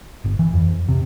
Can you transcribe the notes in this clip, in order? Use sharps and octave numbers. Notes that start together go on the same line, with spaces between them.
G1
E3
F2
C3